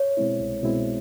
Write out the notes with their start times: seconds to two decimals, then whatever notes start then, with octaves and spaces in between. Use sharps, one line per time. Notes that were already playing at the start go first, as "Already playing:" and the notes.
Already playing: C#5
0.17 B2 G#3 C4 E4
0.40 C2
0.63 B2 G#3 C4 E4